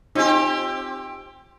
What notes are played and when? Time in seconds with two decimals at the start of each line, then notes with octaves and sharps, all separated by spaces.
0.15 C4 D#4 F4 G4 G#5